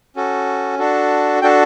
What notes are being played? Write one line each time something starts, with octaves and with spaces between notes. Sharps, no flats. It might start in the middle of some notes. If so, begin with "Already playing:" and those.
C#4 F#4 A4
D4 F#4 A4
D4 F#4 A4 G5